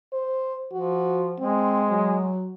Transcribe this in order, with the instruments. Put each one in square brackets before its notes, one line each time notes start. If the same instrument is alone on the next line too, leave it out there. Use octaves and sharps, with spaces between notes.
[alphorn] C5
[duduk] F3 [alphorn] F#4
[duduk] G#3 [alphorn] C4
[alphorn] F#3